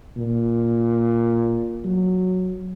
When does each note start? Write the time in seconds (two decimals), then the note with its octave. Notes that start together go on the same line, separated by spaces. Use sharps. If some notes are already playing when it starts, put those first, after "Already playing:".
0.17 A#2
1.84 F#3